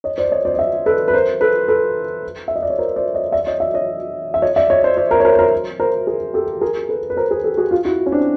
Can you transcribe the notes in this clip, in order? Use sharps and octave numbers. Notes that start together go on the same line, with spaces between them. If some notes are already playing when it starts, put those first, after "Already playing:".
C#5 D#5
C5 D5
C#5 D#5
C5 D5
D#5
D5 E5
A4 B4
B4
A#4 C5
A4 B4
A4 B4
E5
D#5
D5
C#5
A#4 C5
C5 D5
C#5 D#5
D5 E5
C#5 D#5
D5 E5
C#5 D#5
E5
C#5 D#5
D5 E5
C#5 D#5
C5 D5
C5 D5
A#4 C5
C#5
A#4 C5
C#5
A#4 C5
A#4 C5
G#4 A#4
G4 A4
G#4 A#4
A4 B4
B4
A#4 C5
G#4 A#4
G4 A4
F#4 G#4
F4 G4
E4 F#4
C#4
C4 D4